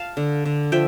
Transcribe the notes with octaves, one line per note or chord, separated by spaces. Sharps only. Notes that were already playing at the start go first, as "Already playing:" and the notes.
Already playing: F5 A5
D3
D3
F3 E5 G5